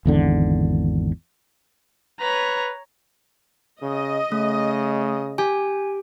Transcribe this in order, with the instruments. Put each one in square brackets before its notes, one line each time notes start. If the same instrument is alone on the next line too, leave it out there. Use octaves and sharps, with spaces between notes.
[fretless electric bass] G#1 E2 D3
[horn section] B4 [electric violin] C#5 A#5
[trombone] C#3 [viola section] D#5
[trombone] C#3 [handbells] A3
[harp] G4 [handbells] G#5